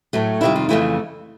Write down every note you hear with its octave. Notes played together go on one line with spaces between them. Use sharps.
A2 F#3 A3
F2 C3 D#3 G3 E4
F4
F2 C#3 E3 A3 E4